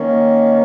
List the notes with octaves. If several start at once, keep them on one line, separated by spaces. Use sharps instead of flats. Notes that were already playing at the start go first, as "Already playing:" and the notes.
Already playing: D#3 A#3 C#4